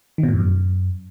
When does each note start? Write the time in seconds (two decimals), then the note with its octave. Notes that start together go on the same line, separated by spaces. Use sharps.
0.18 D#3
0.23 B2
0.28 A2
0.34 F2
0.39 F#2